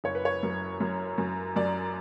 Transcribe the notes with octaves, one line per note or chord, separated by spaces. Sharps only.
F#1 C#5
B4
C#5
F#2
F#2
F#2
F#2 D5